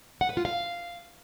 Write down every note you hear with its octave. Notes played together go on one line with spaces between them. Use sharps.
F#5
B4
F4
F5